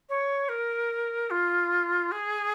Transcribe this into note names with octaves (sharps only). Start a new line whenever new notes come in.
C#5
A#4
F4
G#4